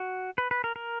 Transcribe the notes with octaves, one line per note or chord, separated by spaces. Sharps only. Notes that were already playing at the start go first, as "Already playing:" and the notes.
Already playing: F#4
B4
B4
A#4
A#4